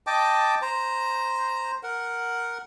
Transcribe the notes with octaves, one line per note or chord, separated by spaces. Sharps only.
D#5 G5 A5 D6
C5 A#5
A#4 F#5